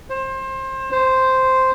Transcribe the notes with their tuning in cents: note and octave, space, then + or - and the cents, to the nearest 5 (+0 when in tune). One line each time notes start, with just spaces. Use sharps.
C5 +25
C5 -5